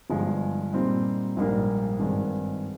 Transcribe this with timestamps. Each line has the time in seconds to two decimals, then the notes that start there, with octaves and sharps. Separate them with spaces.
0.10 G1 G2 F3 G#3
0.73 A#2 G3 C4 D#4
1.36 A#1 G#2 G3 A#3 D4
2.00 G#1 G2 D#3 G#3